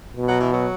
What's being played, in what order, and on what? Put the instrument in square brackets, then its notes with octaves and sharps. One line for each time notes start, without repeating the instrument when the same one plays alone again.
[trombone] B2
[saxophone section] F#3
E3
F#3